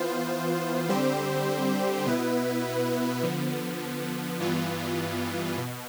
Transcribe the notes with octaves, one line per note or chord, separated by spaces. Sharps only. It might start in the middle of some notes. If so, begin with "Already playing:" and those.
Already playing: E3 B3 F4 C5
D3 G3 C4 G4 C5
B2 B3 E4 B4
D3 F3 B3
G2 E3 B3 F4
B2